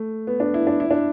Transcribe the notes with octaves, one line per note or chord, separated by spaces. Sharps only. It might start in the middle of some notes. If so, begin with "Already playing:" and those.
Already playing: A3
B3
D4
E4
D4
E4
D4